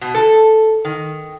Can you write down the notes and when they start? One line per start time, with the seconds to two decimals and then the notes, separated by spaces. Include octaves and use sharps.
0.01 B2
0.14 A4
0.85 D#3